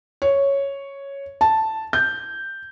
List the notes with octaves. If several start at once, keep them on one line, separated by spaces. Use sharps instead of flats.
C#5
A5
G6